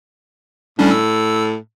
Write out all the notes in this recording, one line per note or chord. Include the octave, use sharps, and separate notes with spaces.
A2 G3 C#4 D4
E6